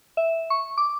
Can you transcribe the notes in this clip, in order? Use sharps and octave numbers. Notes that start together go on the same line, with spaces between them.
E5
C#6
D6